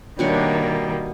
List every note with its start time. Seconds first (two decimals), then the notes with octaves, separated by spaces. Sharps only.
0.19 B2 D#3 G3 A#3 D4 C#5